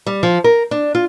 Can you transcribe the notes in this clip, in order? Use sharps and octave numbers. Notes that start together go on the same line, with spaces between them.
G3
F3
A#4
D4
F4